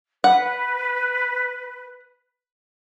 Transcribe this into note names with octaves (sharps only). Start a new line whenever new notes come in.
B4 F#5